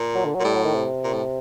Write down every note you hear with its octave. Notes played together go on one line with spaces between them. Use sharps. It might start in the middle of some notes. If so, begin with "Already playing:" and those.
Already playing: A#2
F#3
D3
F#3
A#2
A2 G3
F#3
D#3
C3
A#2
A2